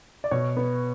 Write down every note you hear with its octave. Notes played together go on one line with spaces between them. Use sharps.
D5
B2 C#5
B3